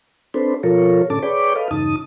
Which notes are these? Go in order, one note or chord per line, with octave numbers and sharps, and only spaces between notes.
C4 D4 A4 B4 C5
B2 F3 F4 A4 A#4 C#5
A2 D3 C#4 A4 A5 D6
G#4 B4 C#5 D5 G5 D6
A4 B4 D#5 F5
E2 G2 C#3 D#4 A5 D#6